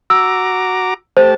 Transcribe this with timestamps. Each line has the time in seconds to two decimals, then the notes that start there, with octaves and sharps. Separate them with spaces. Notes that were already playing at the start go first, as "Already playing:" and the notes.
0.10 F#4 A#5 D6 E6
1.17 A3 G4 C5 A5